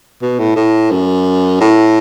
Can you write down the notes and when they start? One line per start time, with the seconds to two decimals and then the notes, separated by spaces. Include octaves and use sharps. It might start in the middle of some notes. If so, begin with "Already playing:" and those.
0.22 B2
0.39 A2
0.56 A2
0.91 F#2
1.61 A2